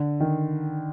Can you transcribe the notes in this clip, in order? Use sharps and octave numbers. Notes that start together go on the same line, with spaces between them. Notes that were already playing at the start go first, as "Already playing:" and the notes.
Already playing: D3
D#3